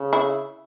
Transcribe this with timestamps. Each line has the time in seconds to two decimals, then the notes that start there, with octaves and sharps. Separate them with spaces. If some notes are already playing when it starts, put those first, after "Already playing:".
Already playing: C#3
0.13 E4